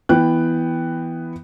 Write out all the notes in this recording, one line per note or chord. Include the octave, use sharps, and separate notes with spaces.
E3 B3 G5 F#6